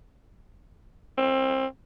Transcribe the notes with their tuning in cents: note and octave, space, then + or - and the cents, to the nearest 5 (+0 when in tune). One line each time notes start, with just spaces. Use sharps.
C4 +25